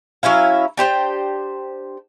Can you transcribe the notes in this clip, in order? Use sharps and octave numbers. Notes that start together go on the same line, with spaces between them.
F#3 C#4 E4 F5
D4 G4 C5 G5